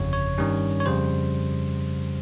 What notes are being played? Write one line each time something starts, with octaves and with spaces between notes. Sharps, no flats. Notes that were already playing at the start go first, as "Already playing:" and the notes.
Already playing: G1 F2 C#3 C#5
C#5
G2 D#3 G3 C#4
C#5
F2 C#3 G3 C5